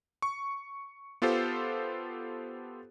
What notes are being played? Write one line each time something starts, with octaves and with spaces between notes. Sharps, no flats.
C#6
B3 F4 G4 A4 C5